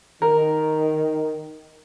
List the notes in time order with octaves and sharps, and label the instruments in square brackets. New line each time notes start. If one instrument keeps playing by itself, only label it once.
[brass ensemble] D#3 [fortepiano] A#4